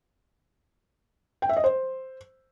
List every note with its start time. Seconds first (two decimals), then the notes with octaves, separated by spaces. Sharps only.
1.42 G5
1.49 E5
1.57 D#5
1.64 C5